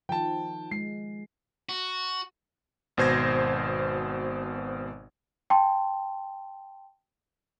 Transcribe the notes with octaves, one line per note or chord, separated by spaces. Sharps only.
D#3 F3 G5 A5
G#3 C7
F#4
G#1 B2 C5 G#6 A#6
G5 A5 C6